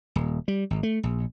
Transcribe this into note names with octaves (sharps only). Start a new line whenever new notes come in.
D#1
G3
G#1
A3
A#1